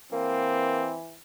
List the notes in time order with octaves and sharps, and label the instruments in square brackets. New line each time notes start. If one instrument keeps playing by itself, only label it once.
[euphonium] E3 [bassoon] A#3 [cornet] C4